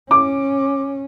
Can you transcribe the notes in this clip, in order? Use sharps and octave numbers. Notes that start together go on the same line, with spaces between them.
C#4 D6